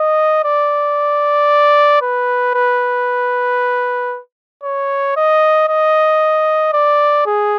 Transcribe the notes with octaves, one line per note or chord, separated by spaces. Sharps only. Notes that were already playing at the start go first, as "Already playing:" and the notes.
Already playing: D#5
D5
B4
B4
C#5
D#5
D#5
D5
G#4